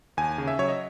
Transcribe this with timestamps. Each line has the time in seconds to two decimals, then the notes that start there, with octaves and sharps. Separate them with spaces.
0.17 D#2 G#5
0.38 C#3
0.48 E5
0.58 F#3 C#5
0.68 D#5